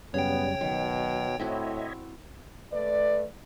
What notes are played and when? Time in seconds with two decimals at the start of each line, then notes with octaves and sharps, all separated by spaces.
0.14 F#2 C#3 G3 B3 C#4 C#5 G5
0.61 B2 D#3 F#3
1.39 A2 C4 E4 F#4 C#5 D#5 E5
2.73 A3 B4 D5